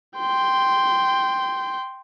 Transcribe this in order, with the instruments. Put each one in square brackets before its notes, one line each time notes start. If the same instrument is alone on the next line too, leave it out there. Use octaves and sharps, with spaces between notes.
[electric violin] G5 C6